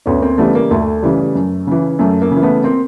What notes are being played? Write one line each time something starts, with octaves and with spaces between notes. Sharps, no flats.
D2 B3 C#4
A#3 C4
C#3 E3 G3 A3 B3
A#3
D2 A3
C#3 E3 G3
F#2
C#3 E3
F#2 A3
A#3
C#3
E3
A3 B3
A#3 C4